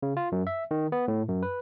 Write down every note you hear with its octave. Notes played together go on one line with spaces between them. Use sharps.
C#3
F4
F#2
E5
D#3
B3
A2
F#2
B4